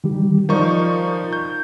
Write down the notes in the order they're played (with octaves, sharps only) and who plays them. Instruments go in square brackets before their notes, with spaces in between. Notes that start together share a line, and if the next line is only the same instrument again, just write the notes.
[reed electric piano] D#3 G3 G4
[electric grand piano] F3 D#4 C#6 [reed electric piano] A#4 D5
[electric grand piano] G6